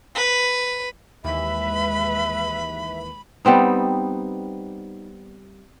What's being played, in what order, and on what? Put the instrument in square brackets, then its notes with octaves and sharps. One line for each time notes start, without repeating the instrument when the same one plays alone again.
[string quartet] B4
[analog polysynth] D#2 E3 [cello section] G#3 B4 [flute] E5 [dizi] B5
[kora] G3 B3 C4 D#4